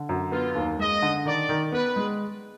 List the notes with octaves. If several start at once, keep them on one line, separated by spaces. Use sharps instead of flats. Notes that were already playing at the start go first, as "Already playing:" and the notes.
Already playing: D3
F#2
B3 F4
D#2
G#3 D#5
D3
D#3 D5
D#3
B3 B4
G#3